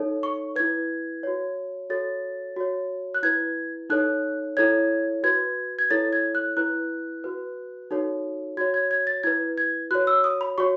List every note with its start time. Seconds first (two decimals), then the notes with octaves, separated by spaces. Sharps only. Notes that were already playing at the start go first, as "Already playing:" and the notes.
Already playing: D#4 A4 C#5
0.23 C#6
0.56 E4 B4 G#6
1.23 F#4 C#5
1.90 F#4 A4 C#5 A6
2.56 F#4 C#5
3.14 F#6
3.23 E4 B4 G#6
3.90 D#4 A4 C#5 F#6
4.57 E4 A4 C#5 G#6
5.23 F#4 B4 G#6
5.79 G#6
5.91 E4 A4 C#5 A6
6.13 G#6
6.35 F#6
6.57 E4 B4 F#6
7.24 F#4 B4
7.91 D#4 F#4 A4 C#5
8.57 F#4 C#5 G#6
8.74 G#6
8.91 G#6
9.07 A6
9.23 E4 B4 G#6
9.58 G#6
9.91 F#4 C#5 F#6
10.07 E6
10.24 D#6
10.41 B5
10.58 F#4 C#5 C#6